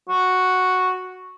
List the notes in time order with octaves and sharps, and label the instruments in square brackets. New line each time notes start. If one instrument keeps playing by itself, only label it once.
[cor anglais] F#4